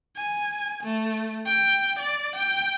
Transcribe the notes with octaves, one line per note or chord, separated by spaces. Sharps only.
G#5
A3
G5
D5
G5